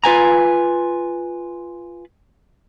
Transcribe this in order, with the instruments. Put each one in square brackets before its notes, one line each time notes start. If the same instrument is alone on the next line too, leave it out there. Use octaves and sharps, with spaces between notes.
[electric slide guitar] F4 B4 G#5 A#5